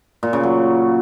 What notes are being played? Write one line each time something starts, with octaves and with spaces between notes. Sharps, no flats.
A#2
C#3
F#3